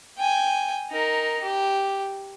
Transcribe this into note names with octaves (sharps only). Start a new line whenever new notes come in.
G5 G#5
D#4 A#4
G4